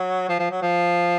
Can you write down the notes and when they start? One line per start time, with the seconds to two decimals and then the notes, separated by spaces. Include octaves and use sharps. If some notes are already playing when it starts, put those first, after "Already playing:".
Already playing: F#3
0.29 F3
0.39 F3
0.51 F#3
0.62 F3